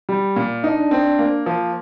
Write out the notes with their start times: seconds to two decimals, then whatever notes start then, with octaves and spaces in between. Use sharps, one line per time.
0.09 G3
0.36 A#2
0.64 D4 D#4
0.91 C4
1.19 A#3
1.46 F3